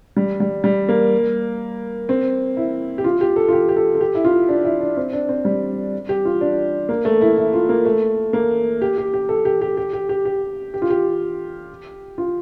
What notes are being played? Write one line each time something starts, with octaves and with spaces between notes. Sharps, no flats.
G3
G3
G3
A#3
C4
E4
G4
F4
G4
A4
F4
G4
G4
A4
A4
G4
E4
F4
D4
E4
D4
C4
D4
C4
G3
G4
F4
D4
A#3
A3
E4
E4
F4
A#3
A3
A#3
G4
G4
G4
A4
G4
G4
G4
G4
G4
G4
G4
F4
G4
F4